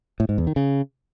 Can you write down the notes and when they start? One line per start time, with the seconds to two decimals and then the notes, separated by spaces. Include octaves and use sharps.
0.20 A2
0.29 G#2
0.38 E2
0.47 D#3
0.56 C#3